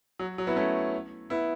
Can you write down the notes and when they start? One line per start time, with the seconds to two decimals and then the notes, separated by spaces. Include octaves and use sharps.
0.19 F#3
0.38 F#3
0.47 B3 E4
0.56 A3 C#4
1.30 B3 E4